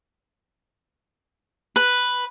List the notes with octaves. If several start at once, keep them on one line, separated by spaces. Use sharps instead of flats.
B4